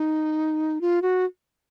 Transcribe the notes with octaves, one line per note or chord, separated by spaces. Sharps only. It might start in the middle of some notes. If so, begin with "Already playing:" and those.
Already playing: D#4
F4
F#4